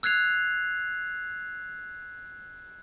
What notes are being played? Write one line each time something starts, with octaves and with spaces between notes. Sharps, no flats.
E6 F#6 G#6 C7 F7